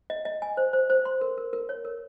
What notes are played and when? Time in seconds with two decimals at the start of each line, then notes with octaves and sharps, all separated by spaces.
0.10 D#5
0.25 D#5
0.42 G#5
0.57 C5
0.73 C5
0.90 C5
1.05 C6
1.21 A#4
1.37 A#4
1.53 A#4
1.69 C#5
1.85 A#4